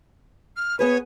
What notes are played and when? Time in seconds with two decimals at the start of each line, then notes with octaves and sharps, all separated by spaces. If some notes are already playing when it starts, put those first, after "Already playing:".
0.56 F6
0.79 B3 G#4 B4 C#5